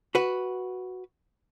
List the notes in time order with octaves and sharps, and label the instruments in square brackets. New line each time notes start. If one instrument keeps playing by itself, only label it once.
[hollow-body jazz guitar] F#4 B4